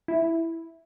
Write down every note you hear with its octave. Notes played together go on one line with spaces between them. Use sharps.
E4